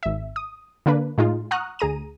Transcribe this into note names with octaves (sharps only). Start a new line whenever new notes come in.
G#1 E5
D#6
D3 A#3 D4 B4
A2 G#3 D#4 F4
F#5 A#5 C#6 D#6 F6 F#6
D2 G#4 A#5 D#7